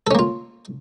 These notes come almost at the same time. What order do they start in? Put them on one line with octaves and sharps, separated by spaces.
A4 C#4 A#3 F4